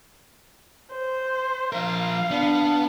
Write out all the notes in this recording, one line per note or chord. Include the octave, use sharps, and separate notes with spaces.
C5
F3 A#4 F5
B3 D4